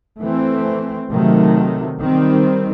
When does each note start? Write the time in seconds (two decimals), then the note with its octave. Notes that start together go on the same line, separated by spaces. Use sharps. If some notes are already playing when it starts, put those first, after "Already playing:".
0.20 E3 A3 C4
1.10 C3 D#3 F#3 A3
2.00 D#3 G3 C4